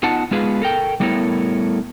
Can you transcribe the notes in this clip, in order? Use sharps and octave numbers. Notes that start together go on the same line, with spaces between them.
B3 D#4 F4 F#5 A5
G#3 B3 F4 G#4 B4 F5
A4 A#4 G5
G3 A3 B3 E4 A#4 C#5